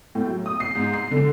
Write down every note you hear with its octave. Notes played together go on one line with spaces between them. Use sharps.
A2
F#3
D#6
C7
G#2
C7
D3